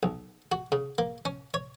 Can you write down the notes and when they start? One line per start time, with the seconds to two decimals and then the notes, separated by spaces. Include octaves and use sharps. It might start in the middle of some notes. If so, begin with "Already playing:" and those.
0.03 B1
0.52 F#4
0.72 C#3
0.98 A#3
1.25 C#4
1.54 C#5